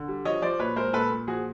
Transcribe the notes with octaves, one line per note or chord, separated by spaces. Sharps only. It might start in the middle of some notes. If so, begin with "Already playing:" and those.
Already playing: D3
G3
F3 C#5 D#5
F3 C5 D5
A#2 B4 C#5
G#3 A#4 C5
A#2 A4 B4
A#2
F3 F#4 G#4